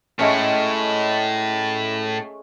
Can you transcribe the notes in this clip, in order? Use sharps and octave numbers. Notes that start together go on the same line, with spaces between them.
A2 G#3 A3 C#4